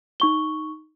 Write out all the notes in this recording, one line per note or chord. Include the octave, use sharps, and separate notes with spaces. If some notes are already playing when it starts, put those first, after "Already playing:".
D#4 C#6 G7